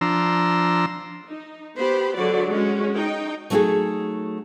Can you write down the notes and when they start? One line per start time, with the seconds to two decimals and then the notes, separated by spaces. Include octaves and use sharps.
0.01 F3 D4 A#5 C6 E6
1.28 D#4
1.77 B3 G4 C5 B5
2.15 D3 F#3 G#3 F#4 D5
2.50 G#3 C#4 F#4
2.96 D#4 G5
3.50 F#3 A3 B3 D#4 F#4 G#4